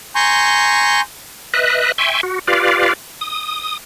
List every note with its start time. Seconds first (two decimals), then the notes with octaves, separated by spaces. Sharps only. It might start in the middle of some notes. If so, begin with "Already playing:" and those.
0.15 G#5 A#5 C6 C#6 G6
1.54 B4 D#5 E5 F#6
1.98 E5 G5 G#5 C6 C#6
2.23 F#4
2.47 F4 G4 B4 D5 F5
3.21 D#6